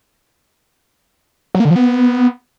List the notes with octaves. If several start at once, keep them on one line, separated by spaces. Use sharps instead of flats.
F#3
A#3
D3
F3
B3